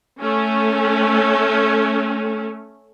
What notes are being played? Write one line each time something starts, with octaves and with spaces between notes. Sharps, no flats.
A3 C#4